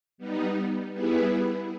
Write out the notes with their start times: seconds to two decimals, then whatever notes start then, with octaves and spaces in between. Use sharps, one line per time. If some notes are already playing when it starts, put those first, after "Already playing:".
0.18 G3 B3 D#4
0.92 G3 B3 E4 G#4 B4